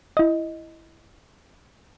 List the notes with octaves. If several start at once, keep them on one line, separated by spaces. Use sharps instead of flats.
E4 D#5